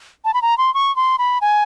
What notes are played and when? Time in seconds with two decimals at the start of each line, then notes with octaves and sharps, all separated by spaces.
0.25 A5
0.34 B5
0.42 A#5
0.58 C6
0.74 C#6
0.96 C6
1.18 B5
1.41 G#5